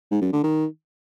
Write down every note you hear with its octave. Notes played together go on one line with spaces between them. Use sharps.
G#2
F#2
D3
D#3